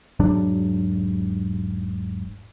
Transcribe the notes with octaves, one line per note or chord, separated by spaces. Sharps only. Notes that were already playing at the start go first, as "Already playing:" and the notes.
E1 G#2 F#3 D4